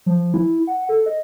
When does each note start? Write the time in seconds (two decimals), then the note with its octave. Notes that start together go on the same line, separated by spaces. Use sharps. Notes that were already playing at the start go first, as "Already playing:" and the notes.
0.06 F3
0.34 E4
0.67 F#5
0.89 A4
1.06 D#5